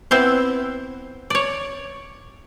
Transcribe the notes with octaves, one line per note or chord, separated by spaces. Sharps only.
B3 C4 E4 C5
C#5 D5